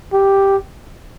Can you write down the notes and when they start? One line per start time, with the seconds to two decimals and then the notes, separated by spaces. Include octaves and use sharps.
0.13 G4